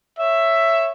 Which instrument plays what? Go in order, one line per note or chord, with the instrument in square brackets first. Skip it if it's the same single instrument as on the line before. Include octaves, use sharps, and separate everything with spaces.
[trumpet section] C#5 E5